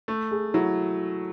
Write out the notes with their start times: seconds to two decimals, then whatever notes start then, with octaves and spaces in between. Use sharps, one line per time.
0.08 A3
0.31 G#4
0.54 F#3 E4